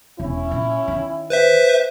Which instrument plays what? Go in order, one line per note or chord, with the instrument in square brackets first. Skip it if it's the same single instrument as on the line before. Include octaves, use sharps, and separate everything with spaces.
[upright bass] E1 [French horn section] C#4 E4
[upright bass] A#2
D#3
[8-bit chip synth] B4 C5 E5